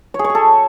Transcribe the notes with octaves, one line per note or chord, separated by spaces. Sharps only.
C#5
G#4
C#5
G#4
A4